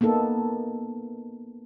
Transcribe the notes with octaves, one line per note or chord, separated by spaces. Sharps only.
A#3 B3 D#4 A4